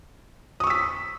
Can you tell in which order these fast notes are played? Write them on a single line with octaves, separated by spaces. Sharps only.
D#6 C#6 E6 B6